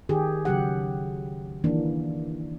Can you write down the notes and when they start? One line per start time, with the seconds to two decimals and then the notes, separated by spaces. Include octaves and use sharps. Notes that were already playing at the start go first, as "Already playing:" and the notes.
0.09 D#3 G4 G#4
0.45 C#3 F#3 G4 F#5
1.64 D#3 E3 A#3 D4